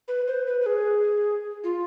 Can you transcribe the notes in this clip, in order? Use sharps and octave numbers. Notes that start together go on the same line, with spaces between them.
B4
C5
B4
B4
G#4
F4